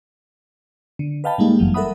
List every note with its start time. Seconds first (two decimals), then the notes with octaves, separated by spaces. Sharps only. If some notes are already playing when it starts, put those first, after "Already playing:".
0.99 D3
1.24 B4 D#5 F5 G5 A5 B5
1.38 A2 G3 G#3 A#3 D#4 G4
1.59 G1 F#2 E3 F#3
1.74 A4 A#4 E5 F#5 B5 D#6